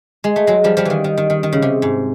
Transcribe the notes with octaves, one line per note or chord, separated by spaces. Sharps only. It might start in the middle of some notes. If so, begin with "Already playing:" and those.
G#3
A3
F#3 G#3
F3 G3
F3 G3
D#3 E3
D#3
D#3
D#3
D#3
C#3
C3
G#2